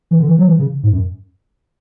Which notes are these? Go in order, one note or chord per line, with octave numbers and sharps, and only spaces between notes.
E3
D3
E3
F#3
E3
C#3
G#2
F#2